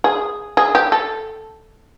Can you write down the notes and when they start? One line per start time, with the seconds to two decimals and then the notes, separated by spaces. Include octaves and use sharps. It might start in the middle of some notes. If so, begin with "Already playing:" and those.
0.04 G#4
0.57 G#4
0.75 G4
0.92 A4